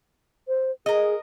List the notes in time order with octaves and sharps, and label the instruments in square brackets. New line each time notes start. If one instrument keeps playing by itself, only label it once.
[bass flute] C5
[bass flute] G#4 [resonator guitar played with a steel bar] A#4 D#5